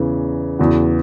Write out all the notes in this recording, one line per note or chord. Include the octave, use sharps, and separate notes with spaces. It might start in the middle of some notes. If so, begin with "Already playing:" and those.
Already playing: E2 C#3 E3
E2 C#3 E3 B3 F#4